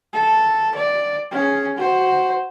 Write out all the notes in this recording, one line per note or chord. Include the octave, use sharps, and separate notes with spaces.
A4
D5
C#4 G#4
F#4 C5